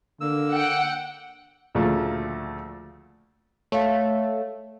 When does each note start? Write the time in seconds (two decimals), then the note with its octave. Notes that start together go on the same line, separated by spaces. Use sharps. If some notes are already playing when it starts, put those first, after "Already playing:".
0.21 D3 A#3 E6
0.51 F#5 G5
1.75 D2 A#2 C#3 F3 A3
3.72 A3 C#5 F5